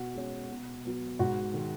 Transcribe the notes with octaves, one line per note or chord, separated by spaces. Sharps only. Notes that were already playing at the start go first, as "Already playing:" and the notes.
Already playing: B2 F#4 F#5
G#3 C#4
B2
F#3 B3
G#2 F#4 F#5
D#3 G#3